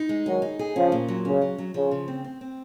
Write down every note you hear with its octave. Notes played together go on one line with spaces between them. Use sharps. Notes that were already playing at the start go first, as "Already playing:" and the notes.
Already playing: D#4
G#3
D#3 F#3 G#4
D#4
G#4
C#3 F3 C#4
A#2
F#3
C#3 C#4
F#3
F#3
C#3 F3
C#3
C4
C4
C4